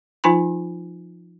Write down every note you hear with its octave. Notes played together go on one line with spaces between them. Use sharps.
F3 D#4 F4 G#5 A#5 B5